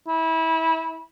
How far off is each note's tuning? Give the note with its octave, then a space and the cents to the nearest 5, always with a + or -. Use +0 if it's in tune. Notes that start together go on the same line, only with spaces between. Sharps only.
E4 -25